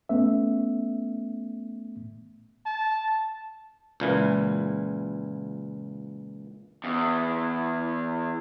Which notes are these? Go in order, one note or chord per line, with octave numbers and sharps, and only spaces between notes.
A3 B3 C#4 E5
A5
C#2 A#2 E3
E2